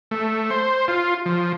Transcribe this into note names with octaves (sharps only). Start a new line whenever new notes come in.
A3
C5
F4
F3